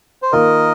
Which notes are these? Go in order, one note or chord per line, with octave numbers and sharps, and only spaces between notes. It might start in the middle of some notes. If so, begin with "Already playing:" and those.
C5
D#3 A#3 F4 A#4 D#5